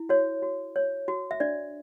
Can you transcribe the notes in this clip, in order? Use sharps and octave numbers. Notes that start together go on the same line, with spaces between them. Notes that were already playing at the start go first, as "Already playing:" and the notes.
Already playing: E4
F#4 C#5
F#4
C#5
F#4
E5
D4 D5